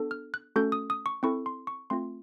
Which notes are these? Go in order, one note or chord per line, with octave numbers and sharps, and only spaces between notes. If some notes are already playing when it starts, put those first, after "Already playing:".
Already playing: B3 D4 F#4 A4
F6
F#6
A3 C#4 F#4 A4 G6
D#6
D#6
C#6
C4 E4 A4 C#6
C6
C#6
A3 C4 F4 C6